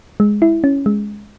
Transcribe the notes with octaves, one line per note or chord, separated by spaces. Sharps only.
G#3
E4
C#4
G#3